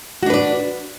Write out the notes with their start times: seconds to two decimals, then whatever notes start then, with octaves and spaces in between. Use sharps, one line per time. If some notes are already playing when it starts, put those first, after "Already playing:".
0.23 F#4
0.26 D4
0.30 B4
0.34 D5